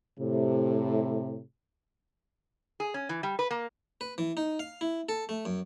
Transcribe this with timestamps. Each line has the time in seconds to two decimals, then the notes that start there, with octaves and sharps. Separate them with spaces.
0.19 A2 C3
2.80 G#4
2.94 C#4
3.09 E3
3.23 G3
3.39 B4
3.51 A#3
4.01 B4
4.18 E3
4.37 D#4
4.59 F5
4.81 E4
5.09 A4
5.29 A3
5.45 F#2